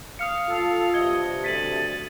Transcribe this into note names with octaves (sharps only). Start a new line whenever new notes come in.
F5 D#6 F6 C#7
F4 A4
G2 C3 D#5 G#6 C#7 G7
D2 A6 B6 D#7 F#7